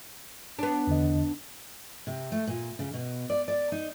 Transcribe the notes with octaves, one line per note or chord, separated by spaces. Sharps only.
B3 D4
E2 D3 D#5
C3
A3
A#2
C#3
B2
D5
D5
D#4